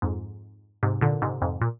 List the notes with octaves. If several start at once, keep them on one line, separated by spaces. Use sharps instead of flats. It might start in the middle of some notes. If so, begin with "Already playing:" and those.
F2 G#2
G#2 C3
A#2 D3
G#2 C3
F2 G#2
A#2